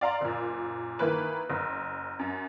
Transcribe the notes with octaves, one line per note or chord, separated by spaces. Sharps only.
D5 F5 A#5 C6
F#1 A#2
D#3 E3 A#3 B4
F#1
F#2